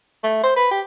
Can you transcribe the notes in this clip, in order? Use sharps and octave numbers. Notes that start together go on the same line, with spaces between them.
A3
C5
B4
G4